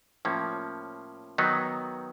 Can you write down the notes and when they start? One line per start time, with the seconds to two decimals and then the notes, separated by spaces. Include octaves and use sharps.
0.25 A2 F3 A#3 C#4
1.38 D#3 F#3 B3 D#4